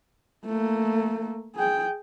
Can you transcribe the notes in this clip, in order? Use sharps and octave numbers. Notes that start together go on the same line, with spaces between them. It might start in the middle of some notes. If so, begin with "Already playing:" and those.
A3 A#3
G#4 G5